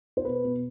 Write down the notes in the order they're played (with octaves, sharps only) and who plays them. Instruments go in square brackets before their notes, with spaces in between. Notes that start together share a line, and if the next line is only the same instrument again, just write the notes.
[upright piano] C5
B2 B4
B2